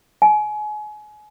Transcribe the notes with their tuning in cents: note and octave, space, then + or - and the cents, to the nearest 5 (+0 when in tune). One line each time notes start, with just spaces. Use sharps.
G#5 +30